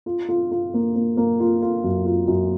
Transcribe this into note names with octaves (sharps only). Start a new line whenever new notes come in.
F4
F4
F4
A#3
A#3
A#3
F4
F4
F#2
F4
F#2